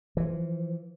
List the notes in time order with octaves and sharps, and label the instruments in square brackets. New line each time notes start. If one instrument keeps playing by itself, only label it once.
[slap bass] E3 F3